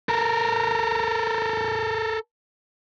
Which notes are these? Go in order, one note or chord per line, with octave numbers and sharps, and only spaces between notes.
A4 A#4